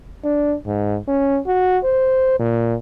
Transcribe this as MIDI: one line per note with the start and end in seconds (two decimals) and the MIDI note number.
0.24 0.55 62
0.67 0.97 44
1.08 1.39 61
1.47 1.78 66
1.84 2.35 72
2.39 2.74 46